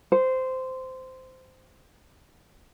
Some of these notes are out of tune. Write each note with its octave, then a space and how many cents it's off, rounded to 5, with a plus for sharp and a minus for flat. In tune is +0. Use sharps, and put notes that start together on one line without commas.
C5 -15